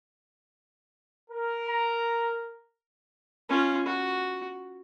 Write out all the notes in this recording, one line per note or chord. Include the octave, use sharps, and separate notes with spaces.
A#4
A#5
C#4 F4
F#4